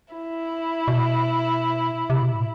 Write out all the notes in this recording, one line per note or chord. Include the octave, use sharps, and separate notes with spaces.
E4
B2
C3
B2
A2